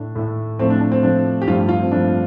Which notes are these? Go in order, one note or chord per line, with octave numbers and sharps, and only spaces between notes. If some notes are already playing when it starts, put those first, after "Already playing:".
Already playing: A2 A3 D4
A2 A3
A2 F3 A3 C4
D4
D4
C4
A2 F3 A3 D4
G4
G2 F3 A3 F4
F4
C4
G2 F3 A3 D4